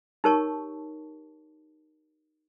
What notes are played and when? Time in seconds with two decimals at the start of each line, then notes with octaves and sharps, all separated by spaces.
0.24 D#4 G4 A#4 C#5 A5 C#6